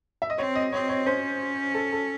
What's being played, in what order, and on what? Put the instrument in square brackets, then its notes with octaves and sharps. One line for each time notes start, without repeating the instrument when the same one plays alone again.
[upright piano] E5
D#5
[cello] C4 [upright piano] C#5
[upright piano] D#5
[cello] C4 [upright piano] C#5
[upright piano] C#5
[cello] C#4 [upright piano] C5
[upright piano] A4
A4